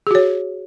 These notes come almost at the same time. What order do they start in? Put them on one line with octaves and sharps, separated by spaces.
G#4 F#4 C#5